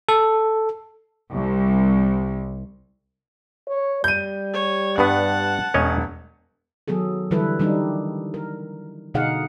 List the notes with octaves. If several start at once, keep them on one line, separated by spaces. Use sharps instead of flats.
A4
C2
C#5
G3 G6 D#7
C#5
G2 B3 F#5 A5
E1 C#4 C#5 D#5
D#3 F#3 B3 G#4 A4
D3 E3 G3 E4 A4 B4
D#3 G3 D4 D#4
A#4
B2 D3 D#4 G#4 F5 F#5